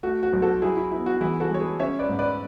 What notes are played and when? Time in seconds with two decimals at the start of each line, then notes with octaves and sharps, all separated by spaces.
0.03 A3 F#4
0.23 F#4
0.33 B1
0.42 F#4 A4
0.62 F#3 E4 G#4
0.77 E4
0.92 B3 E4
1.06 F#4
1.21 E3 E4 G#4
1.40 F#4 A4
1.50 G#3 C#5
1.60 G#4 B4
1.79 C#4 C#5 E5
1.99 B4 D5
2.09 G#2
2.19 B4 D5